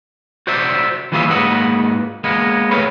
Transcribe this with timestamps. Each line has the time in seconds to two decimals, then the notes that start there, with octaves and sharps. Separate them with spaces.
0.47 F#4 C5 D5 E5
1.12 E3 G3 A#3 F4 G#4 E5
1.29 G#2 A#3 B4 D#5 F#5
2.24 G#3 A#3 B3
2.71 A3 C4 A#4 B4 C#5